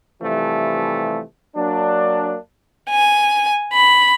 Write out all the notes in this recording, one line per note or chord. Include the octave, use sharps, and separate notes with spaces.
C3 E3 F3 G3 A3
F#3 A#3 D4
G#5
B5